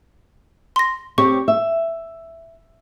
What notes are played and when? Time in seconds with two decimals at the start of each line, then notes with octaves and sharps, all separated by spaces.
0.76 C6 A#6
1.18 C4 G4 C#5 C#6
1.48 E5